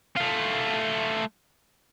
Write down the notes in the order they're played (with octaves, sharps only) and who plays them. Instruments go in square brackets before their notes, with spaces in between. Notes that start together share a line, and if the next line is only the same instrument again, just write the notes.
[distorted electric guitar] A3 F4